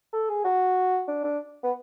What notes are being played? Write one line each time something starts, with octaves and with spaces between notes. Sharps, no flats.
A4
G#4
F#4
D4
D4
B3